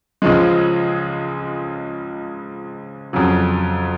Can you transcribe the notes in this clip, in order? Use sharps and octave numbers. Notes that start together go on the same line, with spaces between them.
C#2 C#3 F3 G#3
F2 C#3 F#3